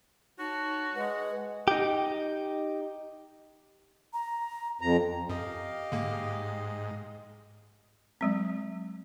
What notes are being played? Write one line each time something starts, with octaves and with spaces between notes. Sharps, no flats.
D#4 F#4 C#5 A5
G#3 B4 F#5
D#4 G4
A#5
F2 A#5
F#2 G4 D#5 F5
G#2 D3 A#3
F#3 G#3 C4